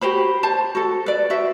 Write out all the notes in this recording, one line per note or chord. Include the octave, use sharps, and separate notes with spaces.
F#4 G4 C5 B5
C5 A5
F#4 A4
B4 D5
F#4 C5 E5